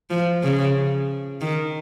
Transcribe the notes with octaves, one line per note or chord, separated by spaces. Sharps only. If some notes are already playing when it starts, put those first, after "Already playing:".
F3
C#3
D#3